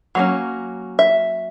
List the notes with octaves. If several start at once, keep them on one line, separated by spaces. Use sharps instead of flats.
F#3 A#3 C#4
E5